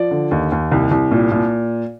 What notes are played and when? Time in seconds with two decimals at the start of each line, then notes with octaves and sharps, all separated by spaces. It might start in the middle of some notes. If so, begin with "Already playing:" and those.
Already playing: F3 D5
0.11 D3
0.31 D#2
0.52 D#2
0.71 C2
0.91 C2
1.11 A#2
1.32 A#2